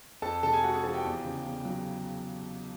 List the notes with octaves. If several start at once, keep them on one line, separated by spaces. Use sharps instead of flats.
F2 A4 A5
C3 A4 A5
G#4 G#5
G#3 F#4 F#5
G#4 G#5
F3 A4 A5
G4 G5
E2
C#3
E2
F#3